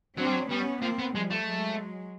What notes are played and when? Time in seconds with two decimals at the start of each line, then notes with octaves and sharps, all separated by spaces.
0.17 F#3 C4 D4
0.26 G3
0.33 F#3
0.50 G3 B3 C#4
0.82 F3 A#3 C4
0.99 B3
1.15 F3 G3 G#3
1.30 A3
1.46 F#3 G#3